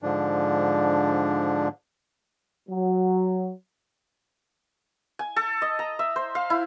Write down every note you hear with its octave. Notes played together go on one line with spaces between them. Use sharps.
G#2 D3 F3 D4
F#3
G#5
A4
D#5
A#5
E5
C5
F5
E4